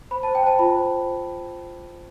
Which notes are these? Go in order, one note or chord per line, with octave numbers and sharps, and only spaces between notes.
C5 B5
C5 A5
G5
C5 A5
F4 B5
C5
C5